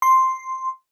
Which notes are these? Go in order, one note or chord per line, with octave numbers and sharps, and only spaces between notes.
C6